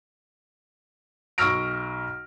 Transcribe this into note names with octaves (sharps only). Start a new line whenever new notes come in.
B1 C#6 E6 F6 A#6 D7